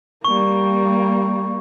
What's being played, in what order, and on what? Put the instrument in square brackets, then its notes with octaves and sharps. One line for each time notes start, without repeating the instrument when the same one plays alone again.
[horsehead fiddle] G3 A#3 [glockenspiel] C#6